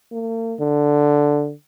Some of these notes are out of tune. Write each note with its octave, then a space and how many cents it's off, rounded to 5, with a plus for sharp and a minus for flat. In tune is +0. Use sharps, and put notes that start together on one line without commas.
A#3 -45
D3 +0